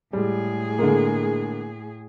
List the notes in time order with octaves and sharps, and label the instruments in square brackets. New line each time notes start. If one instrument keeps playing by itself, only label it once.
[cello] A2 G#4 [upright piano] G3 G#3
[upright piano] D3 G#3 A#3